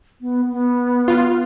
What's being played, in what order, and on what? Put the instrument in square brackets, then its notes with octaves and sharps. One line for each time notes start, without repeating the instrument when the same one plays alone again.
[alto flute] B3
B3
[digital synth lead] F4